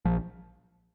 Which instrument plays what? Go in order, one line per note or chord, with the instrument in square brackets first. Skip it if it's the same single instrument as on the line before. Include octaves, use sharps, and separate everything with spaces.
[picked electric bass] A#1 F3